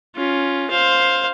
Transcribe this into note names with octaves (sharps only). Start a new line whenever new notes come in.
C#4 F4
C5 F5